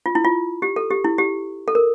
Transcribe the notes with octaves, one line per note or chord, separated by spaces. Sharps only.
F4
E4
F4
G4
A4
G4
E4
G4
A4
A#4